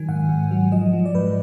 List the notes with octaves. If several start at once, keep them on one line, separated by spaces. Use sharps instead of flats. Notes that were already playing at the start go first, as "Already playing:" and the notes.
Already playing: D#3 F#3 G#5
G#2 F#5
G#2
F#3
F3 D#5
F3
D5
G#2 B4